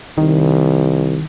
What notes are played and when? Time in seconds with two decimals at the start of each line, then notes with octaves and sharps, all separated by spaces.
0.18 C2 D#3